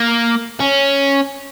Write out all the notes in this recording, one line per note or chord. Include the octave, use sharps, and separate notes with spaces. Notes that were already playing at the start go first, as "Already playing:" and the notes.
Already playing: A#3
C#4